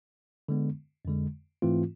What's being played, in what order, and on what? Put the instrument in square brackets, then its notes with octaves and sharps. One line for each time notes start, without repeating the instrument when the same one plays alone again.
[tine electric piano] D3 G#3 B3
F2 D3 G#3
G#2 E3 A3 C4 F4